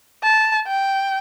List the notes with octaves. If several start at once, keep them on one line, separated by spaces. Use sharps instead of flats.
A5
G5